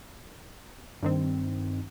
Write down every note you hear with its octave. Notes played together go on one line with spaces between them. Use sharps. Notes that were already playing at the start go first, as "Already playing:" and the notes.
G2 D#3 C4